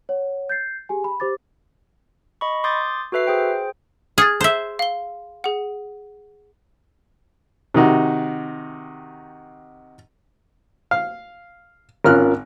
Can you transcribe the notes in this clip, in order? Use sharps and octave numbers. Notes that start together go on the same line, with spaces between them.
C#5 F#5
G6 A6 C7
G4 G#4 G#5
B5
G4 C5 D6 A6
D#5 B5 C#6
C6 D6 D#6 G6 A6
F#4 A4 B4 E5 C7
G#4 C5 G5
G#4 F6 G#6 A6
C5 E5
F5 G7
G#4 F#5
C3 D#3 D#4 F#4
F5
G#1 C#4 F4 A#4 F6 F#6